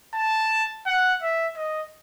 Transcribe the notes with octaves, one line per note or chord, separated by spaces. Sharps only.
A5
F#5
E5
D#5